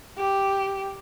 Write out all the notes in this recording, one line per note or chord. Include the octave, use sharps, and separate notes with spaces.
G4